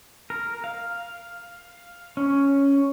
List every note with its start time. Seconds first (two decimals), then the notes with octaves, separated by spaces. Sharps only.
0.30 A#4
0.64 F5
2.17 C#4